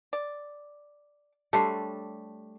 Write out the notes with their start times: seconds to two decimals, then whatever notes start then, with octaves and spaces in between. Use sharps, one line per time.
0.13 D5
1.53 G3 A3 D4 A4 C#5 C6